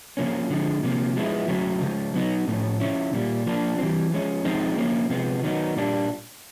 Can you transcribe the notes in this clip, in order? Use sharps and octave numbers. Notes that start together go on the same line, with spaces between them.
C#3 F3 A#3 C#4
D3 F3 G#3
C3 F3 A#3
F3 G#3 B3 E4
C#3 F#3 A3
C#3 F3 G#3
F#3 B3 D#4
A2 F3 A3 C#4
C#3 F3 A3 C#4 E4
A#2 G3 A#3
F3 A#3 D4
E3 G3 C4
F3 G#3 C#4
F3 G#3 C4 D#4
F3 A#3 C#4
C3 F3 G#3 B3
D#3 F#3 B3 D#4
A#2 G3 A#3 D4